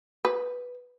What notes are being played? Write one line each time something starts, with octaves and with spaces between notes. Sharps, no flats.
B4